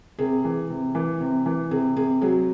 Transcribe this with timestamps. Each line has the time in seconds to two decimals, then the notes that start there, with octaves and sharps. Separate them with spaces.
0.19 C3 G#4
0.45 E3
0.70 C3
0.95 E3
1.20 C3
1.46 E3
1.71 C3 G#4
1.96 C3 G#4
2.22 F#3 G#4